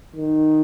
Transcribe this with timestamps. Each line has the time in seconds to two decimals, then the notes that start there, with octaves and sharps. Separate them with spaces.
0.15 D#3